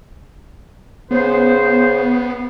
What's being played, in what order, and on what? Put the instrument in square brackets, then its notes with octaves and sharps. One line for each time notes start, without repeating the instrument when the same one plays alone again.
[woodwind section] C#3 C5 [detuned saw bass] B3